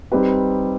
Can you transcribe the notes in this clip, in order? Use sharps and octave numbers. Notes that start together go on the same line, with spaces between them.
G3 C4 D#4 G4 B4